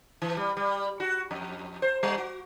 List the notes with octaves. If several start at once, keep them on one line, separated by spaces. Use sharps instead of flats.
E3
G3
G3
F#4
F2
C5
G3
F#4